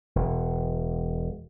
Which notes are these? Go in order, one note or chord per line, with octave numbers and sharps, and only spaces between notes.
E1